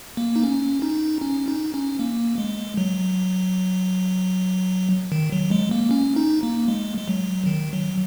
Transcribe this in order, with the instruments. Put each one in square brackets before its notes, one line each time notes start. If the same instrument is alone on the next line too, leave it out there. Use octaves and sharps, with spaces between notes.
[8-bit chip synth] A#3
D#4
C#4
D#4
C#4
D#4
C#4
A#3
G#3
F#3
D#3
F#3
G#3
A#3
C#4
D#4
A#3
G#3
G#3
F#3
D#3
F#3